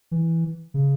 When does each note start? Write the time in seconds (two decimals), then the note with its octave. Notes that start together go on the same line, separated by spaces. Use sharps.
0.11 E3
0.74 C#3